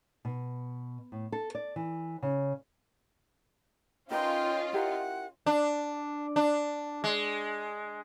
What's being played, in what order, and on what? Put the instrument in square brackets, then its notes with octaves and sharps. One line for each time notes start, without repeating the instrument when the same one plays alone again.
[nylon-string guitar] B2
A2
A4
D5
E3
C#3
[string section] C#4 F4 [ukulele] D#4 A#4 B4 [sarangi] D#5 [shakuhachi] G5
[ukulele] E4 G4 A#4 [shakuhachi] F#5
[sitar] D4
D4
G#3